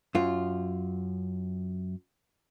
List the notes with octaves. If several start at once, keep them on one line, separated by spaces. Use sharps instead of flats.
F#2 F4